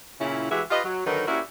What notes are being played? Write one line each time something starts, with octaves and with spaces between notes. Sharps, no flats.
A#2 C#3 C#4 E4
E3 G#3 F#4 G4 E5
F4 G4 B4 D#5
F#3
D3 D#3 F#3 D#4 A#4 B4
A#3 C#4 E4 F#4 G4 D5